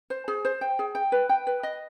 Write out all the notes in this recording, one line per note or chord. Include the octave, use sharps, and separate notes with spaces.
C5
G#4
C5
G5
G#4
G5
B4
G5
B4
D#5